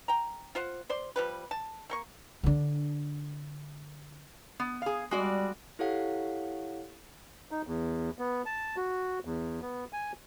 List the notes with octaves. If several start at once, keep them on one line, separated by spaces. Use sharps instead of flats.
G5 A#5
F4 C5 F5 F#5
C5 D5 C6
F3 G3 B4
A5
A3 A#3 C#6
D3 D4
B3
G#4 F5
G3 G#3 F#4 D5
E4 G4 A4 C#5 F5 F#5
D#4
E2
B3
A5
F#4
E2
B3
G#5